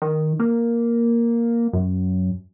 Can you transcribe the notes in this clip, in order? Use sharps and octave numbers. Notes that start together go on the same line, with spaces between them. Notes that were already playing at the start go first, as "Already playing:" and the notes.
D#3
A#3
F#2